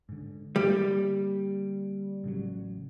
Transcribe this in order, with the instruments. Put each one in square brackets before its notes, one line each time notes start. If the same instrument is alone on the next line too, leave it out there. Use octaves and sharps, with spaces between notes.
[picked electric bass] G#2 D3
[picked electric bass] D3 A#3 [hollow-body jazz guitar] G3
[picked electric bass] A1 C#3 F#3